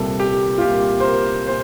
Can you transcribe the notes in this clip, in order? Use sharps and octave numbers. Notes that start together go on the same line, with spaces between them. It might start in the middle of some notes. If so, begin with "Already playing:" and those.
Already playing: C2 A#2 G3 A#3 A4
G4
F4
C2 A#2 G3 A#3 G4
C5
A#4
A#2 C5